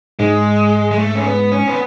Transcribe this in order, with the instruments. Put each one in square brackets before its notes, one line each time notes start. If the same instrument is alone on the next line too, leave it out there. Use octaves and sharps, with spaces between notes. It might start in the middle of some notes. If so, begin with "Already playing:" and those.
[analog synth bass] G#2 [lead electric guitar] G#3
[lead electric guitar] G#3
A3
C#4
B3
C#4
B3